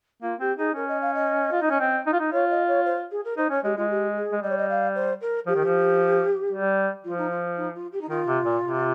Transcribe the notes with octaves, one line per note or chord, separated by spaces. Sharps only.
A#3 F4
C4 G4
D#4 G#4
C#4 A#4
D#5
F5
D#5
F4
D#4
C#4
C4
D#4
F4
D#4
F4 C#5
D#5
C#5
C5
G#4
A#4
D#4 C5
C#4 C#5
G#3 G4
G#3 F4
G4
G#4
G#3
G3 D#5
C#5
D#5
F5
C5
A#4
F3 G4
D#3
F3
G3
F3 F4
D#4
F4
D#4
F4
G4
D#4
D#3 F4
C3
A#2
C3